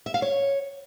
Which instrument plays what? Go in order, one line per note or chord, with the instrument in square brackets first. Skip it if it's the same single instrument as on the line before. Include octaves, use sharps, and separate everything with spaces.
[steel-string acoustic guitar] E5
F5
C#5